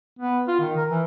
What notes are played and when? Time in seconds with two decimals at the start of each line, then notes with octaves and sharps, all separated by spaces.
0.19 B3
0.48 F4
0.60 D#3
0.77 A#4
0.90 E3